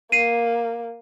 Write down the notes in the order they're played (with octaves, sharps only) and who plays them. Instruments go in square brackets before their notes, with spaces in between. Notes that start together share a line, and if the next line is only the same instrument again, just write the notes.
[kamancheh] A#3 [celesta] C7 D#7